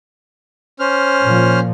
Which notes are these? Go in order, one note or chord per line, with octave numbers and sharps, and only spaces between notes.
C#4 C5 F6
A#2 F3